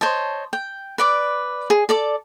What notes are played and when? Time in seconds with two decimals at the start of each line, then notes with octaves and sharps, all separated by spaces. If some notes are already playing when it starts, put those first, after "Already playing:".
0.01 C5 C#5 D#5 A5
0.53 G5
0.98 B4 D5 D6
1.70 G#4
1.89 A4 D5 D6